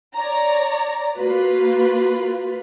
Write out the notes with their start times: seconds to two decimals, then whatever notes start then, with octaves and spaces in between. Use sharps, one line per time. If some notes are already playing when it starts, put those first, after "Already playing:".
0.15 C#5 D5 A#5
1.16 A#3 F4 F#4 B4